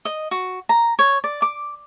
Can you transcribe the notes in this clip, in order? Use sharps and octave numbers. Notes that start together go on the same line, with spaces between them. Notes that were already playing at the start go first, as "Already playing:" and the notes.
D#5
F#4
A#5
C#5
D5
D6